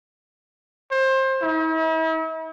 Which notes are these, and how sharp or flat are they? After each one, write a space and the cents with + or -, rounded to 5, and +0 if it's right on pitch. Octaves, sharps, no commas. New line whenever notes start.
C5 +25
E4 -45